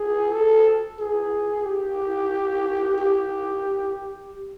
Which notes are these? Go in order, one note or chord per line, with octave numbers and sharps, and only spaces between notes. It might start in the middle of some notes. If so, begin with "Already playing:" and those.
Already playing: G#4
A4
G#4
G4
G4